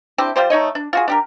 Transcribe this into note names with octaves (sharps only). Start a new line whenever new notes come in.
C4 D4 E4 G4
G3 F4 G4 C5
A3 D#4 C#5 D#5
D4
F4 F#4 G#4
D4 G4 A#4